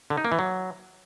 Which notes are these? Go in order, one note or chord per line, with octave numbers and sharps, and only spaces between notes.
D3
D#4
A#3
E3
F#3